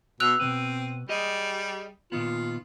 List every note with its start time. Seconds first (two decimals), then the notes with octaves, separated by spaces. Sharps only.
0.20 B2 E6 F#6 F7
0.40 B2 D#3 C4 B4
1.09 G3 G4 G#4 D#5
2.12 A#2 D#3 B3 F4